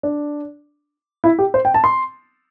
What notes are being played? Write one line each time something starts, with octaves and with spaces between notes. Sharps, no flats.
D4
E4
G4
C5
G5
A5
C6